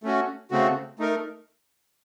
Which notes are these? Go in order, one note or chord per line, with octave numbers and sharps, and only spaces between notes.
A3 C#4 F#4
C#3 A3 C4 F#4
A3 D#4 A#4